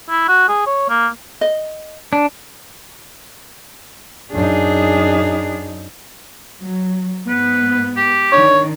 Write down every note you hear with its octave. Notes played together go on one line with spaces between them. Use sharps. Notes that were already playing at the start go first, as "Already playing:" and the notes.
E4
F#4
G#4
C#5
A#3
D#5
D4
F#2 D4 D#4 G#4
F#3
G#2 B3 B4
G4
D#3 D4 C#5